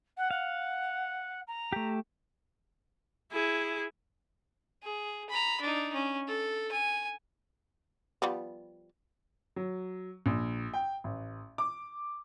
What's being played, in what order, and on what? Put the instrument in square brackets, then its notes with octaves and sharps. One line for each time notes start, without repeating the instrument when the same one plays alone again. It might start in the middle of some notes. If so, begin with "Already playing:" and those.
[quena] F#5
[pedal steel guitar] F5 [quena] F#5
[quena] A#5
[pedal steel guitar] A3 G4
[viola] E4 G#4
[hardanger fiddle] G#4
A#5 B5
D4 D#4
C#4
A4
G#5
[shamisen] F3 G3 B3
[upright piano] F#3
A#1
G5
A1
D6